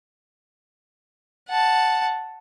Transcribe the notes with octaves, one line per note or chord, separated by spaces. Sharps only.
F#5 A5